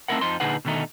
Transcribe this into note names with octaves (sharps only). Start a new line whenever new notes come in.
A3 C4 D#4 E4 A#4 F#5
F2 F3 D#4 C6
A#2 D3 D#4 G#4 B4 F#5
B2 D3 D#3 A3 D#4